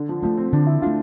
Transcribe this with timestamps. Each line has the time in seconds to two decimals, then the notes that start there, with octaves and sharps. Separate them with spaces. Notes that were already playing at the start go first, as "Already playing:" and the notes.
Already playing: D3
0.09 F3
0.23 F3 A3 D4
0.38 C4
0.53 D3 D4
0.67 E4
0.82 A3 D4 F4